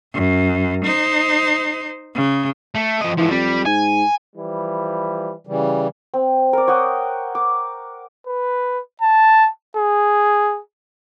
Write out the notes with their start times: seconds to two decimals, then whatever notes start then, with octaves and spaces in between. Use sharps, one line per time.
0.14 F#2
0.85 D#4 C5
2.15 C#3
2.75 A3
3.01 F3 D#5
3.18 G#2 E3 F3
3.31 F2 G3
3.66 G#2 G#5
4.36 E3 F3 G3
5.47 C#3 E3 G3
6.14 C4
6.53 A#4 D5
6.68 C#5 F#5 G5 D#6
7.35 D6
8.27 B4
9.02 A5
9.77 G#4